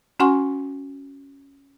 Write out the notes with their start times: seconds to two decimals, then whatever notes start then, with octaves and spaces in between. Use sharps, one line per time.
0.19 C#4 F#4 F#5 G#5 C6 C#6